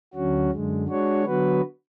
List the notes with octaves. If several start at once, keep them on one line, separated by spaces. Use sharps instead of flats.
D2 D3 F#3 C#4 F#4
F#2 D3 G#3
G#3 D4 F#4 C#5
D3 F#3 B3 F#4 B4